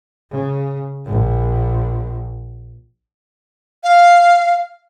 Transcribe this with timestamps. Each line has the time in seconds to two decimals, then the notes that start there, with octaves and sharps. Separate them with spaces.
0.31 C#3
1.06 A#1
3.84 F5